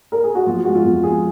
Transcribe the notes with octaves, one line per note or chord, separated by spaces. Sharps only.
A#4
G#4
F#4
F3 F4
G#3 F#4
F4
F2
G#3 G#4